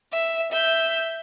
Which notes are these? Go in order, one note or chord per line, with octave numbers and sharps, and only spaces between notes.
E5
E5 G6